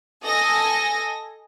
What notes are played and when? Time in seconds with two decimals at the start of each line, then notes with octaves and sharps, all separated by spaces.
0.24 A4 D#5 G#5 D#6 A#6